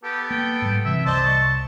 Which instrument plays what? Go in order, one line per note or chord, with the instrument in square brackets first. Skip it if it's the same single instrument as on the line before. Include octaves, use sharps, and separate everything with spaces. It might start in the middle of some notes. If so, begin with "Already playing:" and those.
[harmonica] B3 A4 [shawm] G4
[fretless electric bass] A#3 [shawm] G5
[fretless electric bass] G#2 G3
[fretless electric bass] F#1 C3 E3 [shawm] E5
[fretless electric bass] C2 [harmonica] C5 D5 D#5 [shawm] A5
[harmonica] C#6